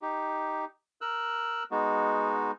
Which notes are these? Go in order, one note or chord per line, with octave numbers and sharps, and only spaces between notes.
D#4 G4
A#4 E6 F#6
G#3 B3 D#4 F#4